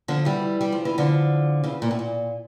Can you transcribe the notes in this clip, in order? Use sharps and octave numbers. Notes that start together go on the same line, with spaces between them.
D3 F3
E3 G3
G3
F3
E3
D3 F3
C#3 E3
A#2
A2
A#2